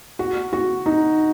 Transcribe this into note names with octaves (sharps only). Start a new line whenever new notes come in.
F#4
F#4
D#4